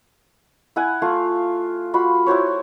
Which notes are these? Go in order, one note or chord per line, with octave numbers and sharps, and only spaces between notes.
E4 F#5 G#5
A3 F4 F5
F4 F#4 B5
E4 F#4 C5 C#5